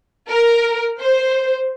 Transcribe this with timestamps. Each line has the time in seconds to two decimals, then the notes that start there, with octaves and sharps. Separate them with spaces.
0.29 A#4
0.99 C5